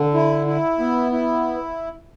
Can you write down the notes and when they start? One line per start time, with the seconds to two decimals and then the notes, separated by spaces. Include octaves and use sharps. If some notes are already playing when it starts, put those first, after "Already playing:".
Already playing: D3
0.14 E4
0.46 E4
0.79 B3
1.12 E4